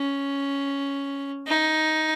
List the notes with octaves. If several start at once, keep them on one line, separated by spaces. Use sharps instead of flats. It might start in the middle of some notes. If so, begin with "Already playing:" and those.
Already playing: C#4
D#4